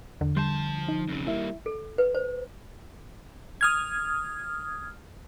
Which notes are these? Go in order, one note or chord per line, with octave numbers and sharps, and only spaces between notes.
E2 D3
F3 G3 A5 C6 G6
D#4
F2 C#3
G3 A#3 E4 E5
A4
B4
C5
D#6 F6 G#6